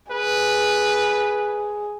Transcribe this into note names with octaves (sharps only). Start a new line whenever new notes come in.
G#4 B4